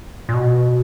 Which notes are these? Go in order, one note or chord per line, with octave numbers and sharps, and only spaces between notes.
A#2
B2